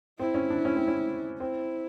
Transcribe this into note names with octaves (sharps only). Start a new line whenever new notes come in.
C4 E4
C#4
D4
C#4
C4
C#4
C4 E4